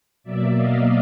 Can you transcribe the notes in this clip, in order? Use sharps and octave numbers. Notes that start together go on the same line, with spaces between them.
B2 F#3 A#3 D5 E5
D#5 F5